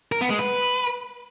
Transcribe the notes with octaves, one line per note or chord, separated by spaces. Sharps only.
A#4
B3
G#3
B4